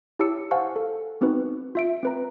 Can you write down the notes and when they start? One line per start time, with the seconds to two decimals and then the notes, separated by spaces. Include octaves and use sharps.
0.19 E4 G4 C#5 A5 E6 C#7
0.51 C5 F5 F#5 G#5 A5 C#6
0.76 A4
1.21 B3 C4 D#4 F#4 B4
1.75 F4 E5 D7
2.03 C4 B4 A#5